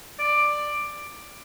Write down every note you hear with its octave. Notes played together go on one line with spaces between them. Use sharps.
D5